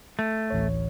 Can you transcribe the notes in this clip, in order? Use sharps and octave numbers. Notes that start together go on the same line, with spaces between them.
A3
A1 D2 C#5